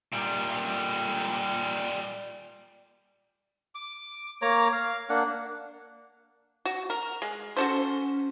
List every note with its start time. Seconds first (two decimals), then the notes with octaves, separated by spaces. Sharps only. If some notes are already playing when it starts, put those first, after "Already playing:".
0.13 A#2 G3
3.75 D6
4.42 A#3 C#5 A#5 D6
4.72 F5
5.09 A#3 D4 F#5
6.65 F#4
6.90 A#4
7.22 G#3
7.57 C#4 F#4 A4 C5